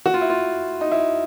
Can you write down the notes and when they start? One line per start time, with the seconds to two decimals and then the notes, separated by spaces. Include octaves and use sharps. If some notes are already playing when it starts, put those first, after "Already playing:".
0.06 F#4
0.14 F4
0.21 E4
0.30 F4
0.81 D#4
0.91 E4